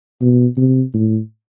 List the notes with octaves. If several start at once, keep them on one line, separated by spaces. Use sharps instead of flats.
B2
C3
A2